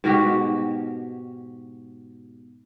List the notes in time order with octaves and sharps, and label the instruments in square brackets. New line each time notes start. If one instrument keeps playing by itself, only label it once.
[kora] G#2 B2 F#4 G4